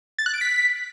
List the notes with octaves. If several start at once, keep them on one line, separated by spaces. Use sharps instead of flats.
A6
F#6
D7
B6